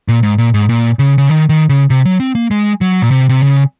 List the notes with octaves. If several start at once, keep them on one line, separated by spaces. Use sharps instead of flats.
A#2
G#2
A#2
G#2
A#2
C#3
C#3
D#3
D#3
C#3
C3
F#3
C4
A#3
G#3
F#3
A#2
C3
C3
C#3